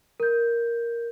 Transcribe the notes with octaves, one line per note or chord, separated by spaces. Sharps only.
A#4 G6